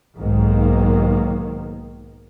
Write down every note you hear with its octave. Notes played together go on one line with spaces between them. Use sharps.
B1 G#2 D#3 A#3